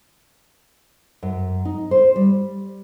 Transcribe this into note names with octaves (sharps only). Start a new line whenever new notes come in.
F#2
D#4
C5
G3